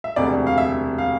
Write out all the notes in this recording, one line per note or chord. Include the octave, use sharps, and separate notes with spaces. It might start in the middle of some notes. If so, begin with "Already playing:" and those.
E5
E1 D2 C3 D5
F5
E5
F5